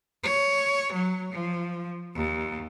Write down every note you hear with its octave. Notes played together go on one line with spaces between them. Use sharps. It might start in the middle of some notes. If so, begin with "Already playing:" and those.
C#5
F#3
F3
D#2